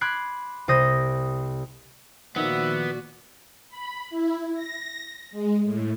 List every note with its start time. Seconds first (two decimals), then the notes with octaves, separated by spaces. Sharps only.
0.01 B5 C6 D6 F#6 G#6 C7
0.68 C2 C5 D#6 G6 A#6
2.36 A#2 D#3 F3 B3 F#4 D5 E5
3.69 B5
4.10 E4
4.54 A#6
5.31 G#3
5.63 A2